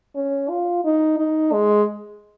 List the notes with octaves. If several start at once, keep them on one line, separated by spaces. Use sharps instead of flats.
C#4
F4
D#4
D#4
G#3